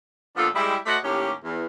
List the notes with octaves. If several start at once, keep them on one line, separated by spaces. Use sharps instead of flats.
A#2 F3 B3 D4 F4 A4
G3 G#3 E4
A3 F#4 C5 D5 D#5 F#5
D#2 A2 C#4 G4
E2